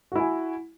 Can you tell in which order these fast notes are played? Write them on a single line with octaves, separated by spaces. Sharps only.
F#4 E4 G#5